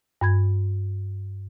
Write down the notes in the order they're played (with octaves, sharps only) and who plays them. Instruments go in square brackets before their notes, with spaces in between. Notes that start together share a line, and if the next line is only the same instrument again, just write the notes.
[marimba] G2 B5 G#6